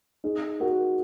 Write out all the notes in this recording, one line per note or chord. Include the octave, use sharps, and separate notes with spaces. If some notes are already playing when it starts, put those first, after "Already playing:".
D#4 G#4
F#4 A#4